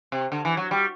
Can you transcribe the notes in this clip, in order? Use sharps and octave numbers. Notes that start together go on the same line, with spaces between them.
C3
D3
E3
F#3
G3